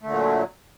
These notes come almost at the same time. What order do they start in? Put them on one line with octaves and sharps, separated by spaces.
A3 D3 A#2 F#3